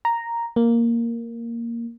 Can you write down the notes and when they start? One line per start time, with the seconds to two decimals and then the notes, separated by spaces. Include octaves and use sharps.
0.05 A#5
0.56 A#3